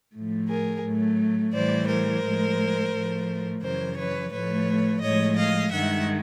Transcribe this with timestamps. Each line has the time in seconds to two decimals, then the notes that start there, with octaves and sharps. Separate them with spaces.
0.14 A2 F3 A3
0.49 G#4 A#4
0.84 A2 F#3 A3
1.53 A2 E3 G3 C5 D5
1.88 A#4 C5
2.24 A2 F3 G#3
2.94 A2 F3 A3
3.62 F#2 C#3 E3 A#4 C5
3.97 B4 C#5
4.32 A2 F3 A3 B4 C#5
5.02 A2 F3 G#3 C#5 D#5
5.37 D#5 F5
5.72 G2 D#3 G#3 E5 F#5